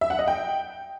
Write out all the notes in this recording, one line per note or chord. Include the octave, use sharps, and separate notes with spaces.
E5
F#5
D#5
G5